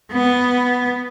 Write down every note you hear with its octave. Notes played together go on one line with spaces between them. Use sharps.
B3